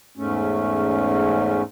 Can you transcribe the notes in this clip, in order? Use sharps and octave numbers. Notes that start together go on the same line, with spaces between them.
E2 G#2 A3 C#4